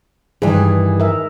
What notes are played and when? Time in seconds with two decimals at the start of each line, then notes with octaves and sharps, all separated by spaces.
0.42 G2 D#3 E3 G#4
1.00 A#4 E5